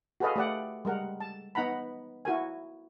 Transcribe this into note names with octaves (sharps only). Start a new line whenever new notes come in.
F#4 G#4 A4 B4 D#5 F5
A3 G4 D5 F#5
G3 G#3 A#4 F#5
A5
B3 D#4 F#5 A#5 B5
E4 F#4 A#4 G#5